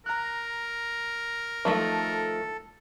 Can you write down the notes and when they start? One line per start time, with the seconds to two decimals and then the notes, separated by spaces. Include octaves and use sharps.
0.06 A#4 A#5 F#6
1.65 D#3 F3 A3 A4